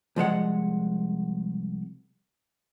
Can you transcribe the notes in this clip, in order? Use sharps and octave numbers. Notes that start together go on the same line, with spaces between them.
C2 F3 G#3 F#5